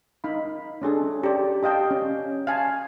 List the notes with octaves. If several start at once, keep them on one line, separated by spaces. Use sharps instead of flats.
D#4 F5 B5
C#4 D4 G#4 A4
G4 D5
G4 D#5 F5 G5 A5
C#4
F5 G#5 A5